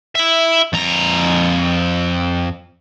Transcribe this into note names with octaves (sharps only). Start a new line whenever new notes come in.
E4 E5
F2 A#5